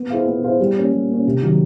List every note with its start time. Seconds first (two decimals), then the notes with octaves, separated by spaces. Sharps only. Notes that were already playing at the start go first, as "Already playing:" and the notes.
Already playing: B3
0.10 E4 G#4 C5 F5
0.27 B3
0.43 E4 G#4 C5 F5
0.59 G3
0.76 A#3 C#4
0.93 G3
1.09 A#3 C#4
1.26 C3
1.41 D#3 F#3